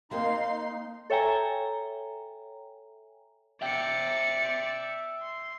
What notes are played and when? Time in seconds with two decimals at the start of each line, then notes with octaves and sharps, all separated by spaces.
0.11 A3 A#3 C4 D#4 F5 C6
1.10 A4 C#5 E5 G5 G#5 A#5
3.62 D5 E5 G5 C#7
5.22 C6